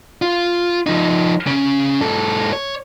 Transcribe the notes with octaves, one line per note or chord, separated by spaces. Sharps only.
F4
F3 D#4
C#3 C#4
G#2 A4
C#5